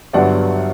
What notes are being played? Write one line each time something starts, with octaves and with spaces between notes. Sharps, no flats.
G1 G2 D3 F#3 B3 D5 F#5